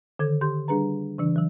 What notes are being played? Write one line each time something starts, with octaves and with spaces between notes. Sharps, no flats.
D3 D#3 A4 G#6
G4 C6 G6
G3 D4 G#4 B4 A#5
C#3 E3 D4
E3 F#3